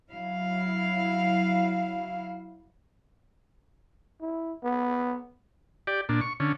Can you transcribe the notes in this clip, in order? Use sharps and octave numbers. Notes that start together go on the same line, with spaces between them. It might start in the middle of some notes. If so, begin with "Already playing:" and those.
F#3 E4 F5
E4
B3
G4 D5
A#2 D4
C#6
D3 C#4